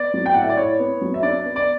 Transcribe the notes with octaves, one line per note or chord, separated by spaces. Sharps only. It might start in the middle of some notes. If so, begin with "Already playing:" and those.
Already playing: B3 D5
F#3
G5
A2 F#5
E5
D5
E4 C#5
B3
F#3
E5
D4 D5
B3
D5